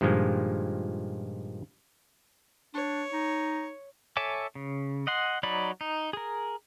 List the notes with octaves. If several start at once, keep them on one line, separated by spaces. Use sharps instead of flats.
G2 A#2 D#3 F3 G#3
D4 C#5
D#4
A4 C#5 E5 G#5 D6
C#3
D#5 F#5 C6
F#3 D#4 C#5 D5 B5
D#4
G#4 A#4